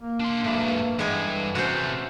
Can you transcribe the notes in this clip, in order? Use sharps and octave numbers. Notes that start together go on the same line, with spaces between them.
A#3
D4 C6
G#2 F#3 A3 D4 B4
G2 E3 G#3 B3 G#5
C3 A3 C#4 F#4 C5